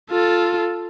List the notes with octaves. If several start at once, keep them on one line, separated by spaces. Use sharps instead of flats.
F4 A4